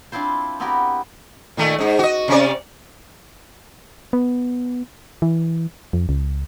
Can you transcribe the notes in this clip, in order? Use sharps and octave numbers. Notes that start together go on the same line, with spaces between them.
C4 D4 E4 F4 C5
B3 C4 E4 F#4 G4 A#4
A#2 D#3 A3
G#2 D#4
F#4 D#5
C3 C#4 D5
B3
E3
F2
C#2